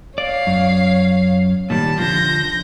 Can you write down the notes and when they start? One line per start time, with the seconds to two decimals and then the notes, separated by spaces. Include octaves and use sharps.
0.18 C#5 D5 F5
0.47 F#2
1.70 A#2 D#3 G3 A5
1.99 D3 F3 G6 A#6